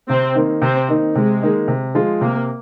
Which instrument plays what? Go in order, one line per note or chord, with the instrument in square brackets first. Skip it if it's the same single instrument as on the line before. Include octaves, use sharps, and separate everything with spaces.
[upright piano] C3 [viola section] C4
[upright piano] D#3 A#3 D#4
[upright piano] C3 [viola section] C4
[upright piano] D#3 A#3 D#4
[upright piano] C3 [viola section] G#3
[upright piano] D#3 A#3 D#4
C3
F3 G#3 F4 G#4
[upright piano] C3 [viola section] A#3